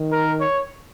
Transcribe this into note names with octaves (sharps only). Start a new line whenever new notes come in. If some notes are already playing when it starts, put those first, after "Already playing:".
Already playing: D#3
A#4
C#5